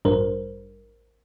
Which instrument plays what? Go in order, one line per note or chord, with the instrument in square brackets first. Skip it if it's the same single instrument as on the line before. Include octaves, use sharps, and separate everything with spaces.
[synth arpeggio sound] A1 A#4 C5 [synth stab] G2